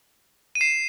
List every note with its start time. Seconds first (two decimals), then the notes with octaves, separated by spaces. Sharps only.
0.55 D#7
0.61 C7 E7